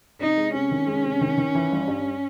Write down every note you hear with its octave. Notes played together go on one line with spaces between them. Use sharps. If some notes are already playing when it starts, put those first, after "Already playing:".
C3 D#4
G#3
C3 C#4
D#3
G#3
C3
D#3
D#3
E3
G1
G2